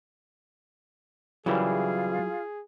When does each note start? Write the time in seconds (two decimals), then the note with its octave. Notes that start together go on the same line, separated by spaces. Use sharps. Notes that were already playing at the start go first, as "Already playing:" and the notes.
1.46 C#3 E3 F#3 G3 E4 F4 G#4 A#4